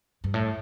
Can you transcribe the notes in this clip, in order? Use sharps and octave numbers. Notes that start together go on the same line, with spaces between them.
G2
A2